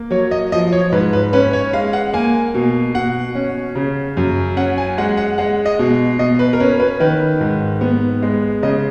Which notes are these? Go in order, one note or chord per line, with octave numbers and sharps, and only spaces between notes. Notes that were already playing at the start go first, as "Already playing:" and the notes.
Already playing: A#3
F#3 C#5
D#5
F3 D#5
C#5
G#2 B4
B4
C#4 B4
C#5
G#3 F5
F#5
A#3 G#5
B2
B2 F#5
C#4
C#3
F#2
C#4 F#5
G#5
G#3 F#5
F#5
G#3 F#5
D#5
B2
B2 D#5
B4
A#4
C#4 B4
B4
D#3 B4
G#2
B3
G#3
C#3 D#5